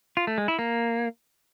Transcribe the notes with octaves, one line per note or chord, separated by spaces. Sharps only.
F4
A3
G#3
E4
A#3